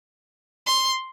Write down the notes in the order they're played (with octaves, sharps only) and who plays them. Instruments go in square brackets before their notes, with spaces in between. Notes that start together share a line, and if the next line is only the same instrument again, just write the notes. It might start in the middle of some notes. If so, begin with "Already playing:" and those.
[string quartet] C6